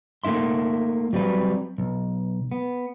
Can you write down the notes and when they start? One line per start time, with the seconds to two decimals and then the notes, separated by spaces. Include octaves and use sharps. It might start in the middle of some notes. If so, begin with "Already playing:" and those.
0.24 A3 A#3 D#4 E5 C6
1.13 F#3 G3 C4 B4
1.78 B1
2.52 B3